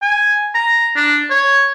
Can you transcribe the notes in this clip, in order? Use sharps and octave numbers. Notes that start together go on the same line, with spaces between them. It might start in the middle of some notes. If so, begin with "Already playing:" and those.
G#5
A#5
D4
C#5